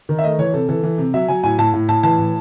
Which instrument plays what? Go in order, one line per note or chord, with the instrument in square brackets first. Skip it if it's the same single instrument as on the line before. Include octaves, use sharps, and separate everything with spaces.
[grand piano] D#3
E5
A3 D#5
E3 C#5
C3 A4
E3 A4
E3
C3
F#3 E5
F#3 G#5
A2 G#5
A2 A5
A2
A2 A5
E3 A5
A2